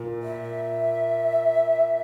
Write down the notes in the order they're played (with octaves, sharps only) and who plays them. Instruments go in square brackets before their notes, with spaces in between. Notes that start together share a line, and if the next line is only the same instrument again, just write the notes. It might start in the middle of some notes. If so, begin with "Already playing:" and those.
Already playing: [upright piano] A#2
[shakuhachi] E5